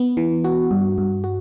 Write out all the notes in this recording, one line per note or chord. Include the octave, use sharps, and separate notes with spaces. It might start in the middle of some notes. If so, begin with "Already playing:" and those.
Already playing: B3
E3
F#4
G2
G2
F#4